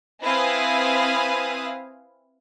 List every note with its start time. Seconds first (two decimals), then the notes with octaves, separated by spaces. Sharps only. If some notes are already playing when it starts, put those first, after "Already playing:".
0.23 C4 E4 B4 F5 G#5 D#6